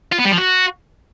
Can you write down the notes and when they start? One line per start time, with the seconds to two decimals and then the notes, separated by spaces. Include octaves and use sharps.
0.12 F4
0.19 B3
0.25 G3
0.32 F3
0.38 F#4